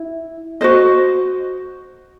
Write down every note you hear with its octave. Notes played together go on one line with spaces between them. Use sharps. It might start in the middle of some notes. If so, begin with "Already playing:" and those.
Already playing: E4
F#4 C5 D#5